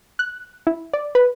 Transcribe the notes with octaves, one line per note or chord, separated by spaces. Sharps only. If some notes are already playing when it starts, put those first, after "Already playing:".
F#6
E4
D5
B4